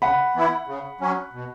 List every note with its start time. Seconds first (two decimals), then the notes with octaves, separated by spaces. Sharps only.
0.02 C#3 F#5 B5
0.35 E3 B3 E4
0.68 C#3
1.01 F#3 C#4
1.33 B2